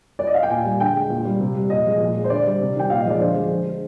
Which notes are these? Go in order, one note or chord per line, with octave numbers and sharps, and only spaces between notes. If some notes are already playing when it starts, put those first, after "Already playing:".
D5
D#5
F5
G5
A#2 G#5
G3
D3 G5
G#3
A#2
G3
C3
G3
A#2 D#5
F3 G#3
A#2
G#3
C5
D3 D5
G3
C3
D#3 G3 G5
A#2 F5
D#5
F3 G#3 D5
D3 C5
F3 G#3
D3
G#3